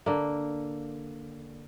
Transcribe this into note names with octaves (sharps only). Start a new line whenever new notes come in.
D3 A#3